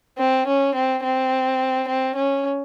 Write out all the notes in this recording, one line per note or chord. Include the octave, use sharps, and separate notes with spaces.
C4
C#4
C4
C4
C4
C#4